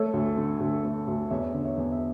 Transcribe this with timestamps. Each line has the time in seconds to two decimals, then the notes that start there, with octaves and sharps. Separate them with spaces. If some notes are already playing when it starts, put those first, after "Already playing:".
Already playing: A3 A4 C#5
0.14 D2
0.37 D3
0.61 D2
0.84 A3
1.07 D2
1.30 E2 C#5 E5
1.54 D3
1.65 C#5 E5
1.77 E2
1.92 E5